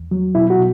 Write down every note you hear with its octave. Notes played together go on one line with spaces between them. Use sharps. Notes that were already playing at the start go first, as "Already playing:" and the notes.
Already playing: E2
F#3
B2 E4
F#4
B2